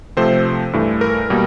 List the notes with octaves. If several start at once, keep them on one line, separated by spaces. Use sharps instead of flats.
C3 F3 A3 C4 C5
G2 E3 A3
A#4
B2 G3 A#3